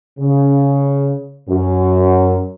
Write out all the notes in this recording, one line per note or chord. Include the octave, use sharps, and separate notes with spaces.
C#3
F#2